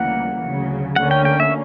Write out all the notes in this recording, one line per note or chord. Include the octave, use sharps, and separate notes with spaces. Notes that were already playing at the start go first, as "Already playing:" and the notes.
Already playing: D2 C#3 E3 G3 A#3 F#5
D2 C#3 F#3
D2 D3 A#3 C#4 F#5
G5
G5
E5